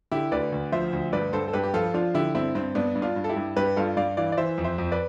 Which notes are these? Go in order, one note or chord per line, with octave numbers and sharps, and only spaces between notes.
D3 E4 G4
D2 B4 D5
D2
F3 C5 E5
D2
G2 B4 D5
G2 A4 C5
A4
G2 G4 B4
G4
F3 F4 A4
F3 D4 F4
D3 E4 G4
G2 C4 E4
G2 C4
G2 B3 D4
G2
D4 F4
G2
A4
E4 G4
G2
G2 G4 B4
G2 F4 A4
G2 D5 F5
E3 D5 F5
D5
E3 C5 E5
F2
C5 E5
F2
B4 D5